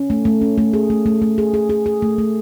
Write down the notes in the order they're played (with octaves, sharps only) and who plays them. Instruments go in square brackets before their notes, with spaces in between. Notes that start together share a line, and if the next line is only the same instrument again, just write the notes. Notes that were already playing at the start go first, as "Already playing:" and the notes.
Already playing: [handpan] C#4
A3
A3
C#4
A3
G#4
A3
A3
A3
G#4
G#4
G#4
G#4
A3
A3